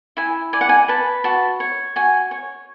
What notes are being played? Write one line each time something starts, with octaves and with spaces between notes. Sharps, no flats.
E4 G#5
D5 G#5
F#5
G#5
B4 A5
F#4 A5
C#5
F#4 G#5
C#5